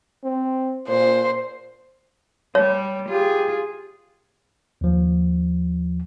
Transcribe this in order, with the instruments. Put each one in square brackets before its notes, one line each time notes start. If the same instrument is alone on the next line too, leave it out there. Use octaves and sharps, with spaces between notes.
[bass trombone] C4
[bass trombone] A#2 [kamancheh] C5
[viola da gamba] G3 [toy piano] C#5
[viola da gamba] F4 G#4 [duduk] G4
[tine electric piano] D#2 F3